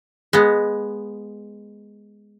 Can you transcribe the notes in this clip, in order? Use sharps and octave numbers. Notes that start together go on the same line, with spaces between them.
G#3 B3